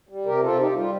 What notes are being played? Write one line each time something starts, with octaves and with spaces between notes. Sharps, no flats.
G3
C3 G4 A#4
C4 F4 A4
D#4 G4
D#4
G3 F4